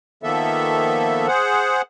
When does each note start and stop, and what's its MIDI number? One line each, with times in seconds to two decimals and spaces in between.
0.23 1.27 51
0.23 1.27 53
0.23 1.27 58
0.23 1.27 59
0.23 1.27 69
0.23 1.27 76
1.28 1.82 68
1.28 1.82 72
1.28 1.82 78